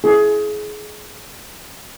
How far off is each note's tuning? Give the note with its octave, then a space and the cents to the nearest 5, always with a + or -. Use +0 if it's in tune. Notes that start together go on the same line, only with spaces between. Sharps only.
E4 +0 G#4 +25